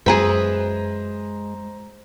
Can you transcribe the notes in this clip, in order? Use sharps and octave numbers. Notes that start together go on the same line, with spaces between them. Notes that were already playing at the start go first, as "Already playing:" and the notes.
F#2 G#3 G#4 B4 C5 E5 A#5